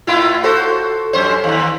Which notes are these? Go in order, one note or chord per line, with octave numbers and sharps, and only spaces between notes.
A2 E4 F4
F#4 A4 C5
F#2 C#4 C5
D#2